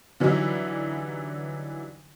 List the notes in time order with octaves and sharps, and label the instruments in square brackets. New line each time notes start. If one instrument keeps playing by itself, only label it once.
[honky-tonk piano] D3 E3 F#3 G3 D#4 E4